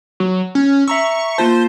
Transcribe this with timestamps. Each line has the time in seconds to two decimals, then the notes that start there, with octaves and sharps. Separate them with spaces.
0.20 F#3
0.55 C#4
0.88 E5 A#5 C#6 E6
1.38 A#3 F4 C5 A5